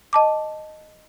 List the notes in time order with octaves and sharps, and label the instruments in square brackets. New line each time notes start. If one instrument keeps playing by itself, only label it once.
[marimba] D#5 A5 D6